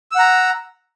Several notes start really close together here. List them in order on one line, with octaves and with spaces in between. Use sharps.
E6 F#5 A#5